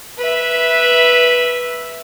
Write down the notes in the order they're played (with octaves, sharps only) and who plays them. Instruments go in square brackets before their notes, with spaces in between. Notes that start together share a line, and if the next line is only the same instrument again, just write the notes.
[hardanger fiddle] B4 E5